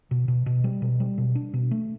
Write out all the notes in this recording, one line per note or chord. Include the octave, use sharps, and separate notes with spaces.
B2
B2
B2
G3
B2
G3
B2
D4
B2
A3